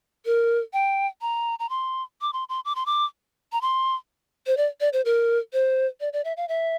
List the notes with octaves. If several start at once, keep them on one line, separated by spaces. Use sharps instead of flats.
A#4
G5
A#5
A#5
C6
D6
C6
C6
D6
C6
D6
A#5
C6
C5
D5
D5
C5
A#4
C5
D5
D5
E5
F5
E5